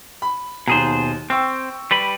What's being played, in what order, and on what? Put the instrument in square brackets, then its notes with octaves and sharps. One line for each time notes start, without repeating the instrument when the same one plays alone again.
[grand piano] B5
[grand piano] D#2 A#5 [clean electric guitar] B2 G#4 C5
[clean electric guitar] C4 [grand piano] G5 C#6 E6
[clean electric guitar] G3 B4 B5